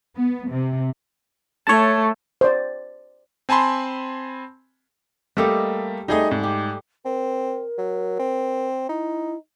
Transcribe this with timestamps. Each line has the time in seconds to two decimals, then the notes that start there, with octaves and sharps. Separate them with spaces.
0.16 B3
0.49 C3
1.67 A3 C#5 A5
2.41 C5 D5
3.49 C4 G#5 A5 B5 C6
5.37 G3 A3 A#3 G4 A4 D#5
6.08 G3 A3 D#4 G#4 D#5
6.31 G#2
6.43 G4
7.05 C4 A#4
7.78 F#3
8.19 C4
8.89 D#4 E4